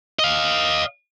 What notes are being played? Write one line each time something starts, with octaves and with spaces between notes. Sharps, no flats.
D#5 F5